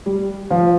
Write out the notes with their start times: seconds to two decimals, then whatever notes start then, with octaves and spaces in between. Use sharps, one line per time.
0.06 G3
0.50 F3